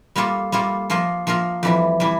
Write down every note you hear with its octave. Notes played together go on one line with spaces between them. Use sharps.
G3 A#3 F4 A4
G3 A#3 F4 A4
F3 A#3 F4 A#4
F3 A#3 F4 A#4
F2 E3 G3
E3 G3